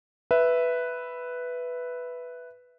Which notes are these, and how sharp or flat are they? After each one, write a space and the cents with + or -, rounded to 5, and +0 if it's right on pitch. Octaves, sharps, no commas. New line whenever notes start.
B4 +0 E5 +0